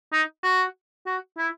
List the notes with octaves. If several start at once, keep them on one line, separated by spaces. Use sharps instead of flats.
D#4
F#4
F#4
E4